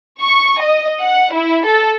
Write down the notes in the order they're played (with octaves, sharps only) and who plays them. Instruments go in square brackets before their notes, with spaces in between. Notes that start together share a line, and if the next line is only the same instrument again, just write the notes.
[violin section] C#6
D#5
F#5
E4
A4